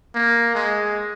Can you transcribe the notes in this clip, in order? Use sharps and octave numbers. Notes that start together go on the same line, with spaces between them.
A#3
G#3